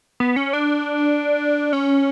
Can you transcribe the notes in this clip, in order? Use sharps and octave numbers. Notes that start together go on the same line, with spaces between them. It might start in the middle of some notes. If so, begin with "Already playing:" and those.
B3
C#4
D4
C#4